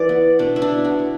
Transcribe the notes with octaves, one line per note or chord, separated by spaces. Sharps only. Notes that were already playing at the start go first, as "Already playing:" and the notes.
Already playing: E3 D5
B3
B2 D4
E4
D4
B2
F#4
B3